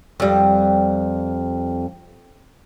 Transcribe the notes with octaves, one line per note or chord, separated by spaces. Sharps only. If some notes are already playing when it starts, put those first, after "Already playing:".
F2 G3